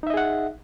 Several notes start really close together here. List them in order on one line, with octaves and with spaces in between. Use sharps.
D#4 E5 D#5 G#4 F#5